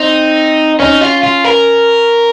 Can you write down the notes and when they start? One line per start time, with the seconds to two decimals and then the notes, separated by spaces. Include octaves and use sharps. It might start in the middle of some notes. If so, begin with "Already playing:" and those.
Already playing: C4 D#4
0.79 C#4 D#4
1.01 F4
1.23 F4
1.44 A#4